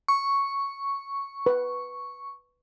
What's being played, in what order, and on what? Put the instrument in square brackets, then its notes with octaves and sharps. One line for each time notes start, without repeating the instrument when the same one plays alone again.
[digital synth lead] C#6
[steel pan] B4